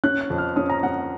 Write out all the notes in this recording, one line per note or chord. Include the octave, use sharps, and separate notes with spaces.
C#4 F#6
F#6
F2
F6
C#4 D#6
A#5
C#4 F#5